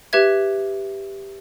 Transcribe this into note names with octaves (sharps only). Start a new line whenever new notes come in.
G4 B4 E5 G#6